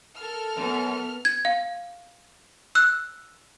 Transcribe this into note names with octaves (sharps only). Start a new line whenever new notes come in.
A4 A#4 F6
F#2 B3
G#6
F5
E6 F#6